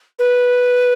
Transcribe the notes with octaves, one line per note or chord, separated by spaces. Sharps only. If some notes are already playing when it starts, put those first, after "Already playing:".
B4